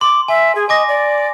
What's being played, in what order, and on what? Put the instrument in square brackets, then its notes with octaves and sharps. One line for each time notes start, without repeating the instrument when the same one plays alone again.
[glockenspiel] C6 [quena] D6
[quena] E5 [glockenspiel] G#5
[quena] G#4
[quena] D#5 [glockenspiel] G#5 D6 A#6
[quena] D5